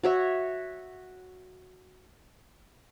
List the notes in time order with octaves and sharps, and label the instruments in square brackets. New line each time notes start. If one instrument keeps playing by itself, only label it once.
[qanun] F#4 C#5 E5